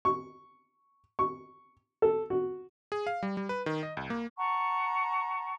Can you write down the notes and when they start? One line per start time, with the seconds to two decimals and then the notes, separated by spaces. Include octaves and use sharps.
0.05 C#6
1.19 C#6
2.02 A4
2.30 F#4
2.92 G#4
3.07 F5
3.23 G3
3.37 G3
3.49 B4
3.66 D#3
3.83 D#5
3.97 C2
4.10 A#3
4.37 F#5 A5 A#5 C#6